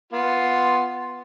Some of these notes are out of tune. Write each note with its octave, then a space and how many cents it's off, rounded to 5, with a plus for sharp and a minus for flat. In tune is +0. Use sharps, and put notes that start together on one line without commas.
B3 +0 F4 +0 C6 +0